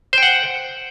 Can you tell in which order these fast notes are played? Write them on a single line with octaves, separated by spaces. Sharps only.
C5 G5 F#5